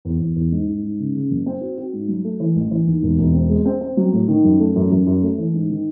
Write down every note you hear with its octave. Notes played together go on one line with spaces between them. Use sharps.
E2
E2
E2
G#2
G#2
G#2
C#3
C#3
F#1
C4
F#4
F#4
G#2
F#3
A3
E3
A1
E3
D#2
E1
E1
C4
G#3
C4
C4
F#3
A2
D#3
F#2
A3
F#2
F#2
F#2
A3
E3
G#2
D#3